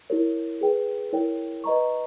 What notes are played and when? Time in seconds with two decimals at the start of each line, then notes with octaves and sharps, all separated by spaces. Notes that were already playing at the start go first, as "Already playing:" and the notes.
0.10 E4 G4 A#4 C#5
0.61 G#4 B4 G5
1.13 E4 A#4 C#5 G5
1.64 B4 D#5 A#5 C#6